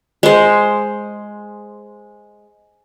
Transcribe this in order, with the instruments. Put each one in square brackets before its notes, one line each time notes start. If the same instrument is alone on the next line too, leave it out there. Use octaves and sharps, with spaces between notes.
[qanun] G#3 C5